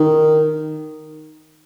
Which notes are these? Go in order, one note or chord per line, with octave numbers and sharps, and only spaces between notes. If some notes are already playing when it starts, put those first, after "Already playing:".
Already playing: D#3